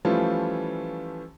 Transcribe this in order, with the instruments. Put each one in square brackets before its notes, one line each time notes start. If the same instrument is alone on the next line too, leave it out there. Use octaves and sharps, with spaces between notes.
[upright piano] E3 F3 G3 A3 C#4 F4